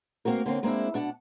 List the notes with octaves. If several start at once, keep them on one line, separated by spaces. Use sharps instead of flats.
A#3 C4 F#4 A#4
D3 A#3 C4 C#4
G#3 A#3 C4 D4 E4
B2 D4 F#5 A5